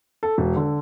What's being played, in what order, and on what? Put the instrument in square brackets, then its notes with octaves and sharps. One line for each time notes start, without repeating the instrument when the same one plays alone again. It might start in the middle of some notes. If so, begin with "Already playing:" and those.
[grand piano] A4
E1
D3